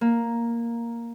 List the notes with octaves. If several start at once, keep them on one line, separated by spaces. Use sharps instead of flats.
A#3